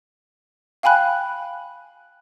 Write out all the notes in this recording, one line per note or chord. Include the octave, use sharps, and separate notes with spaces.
F5 G5 G#5 B5 F#6